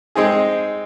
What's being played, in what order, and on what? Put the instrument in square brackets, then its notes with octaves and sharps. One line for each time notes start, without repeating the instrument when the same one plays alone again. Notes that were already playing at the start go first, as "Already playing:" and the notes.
[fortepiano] G#3 C4 D#4 G#4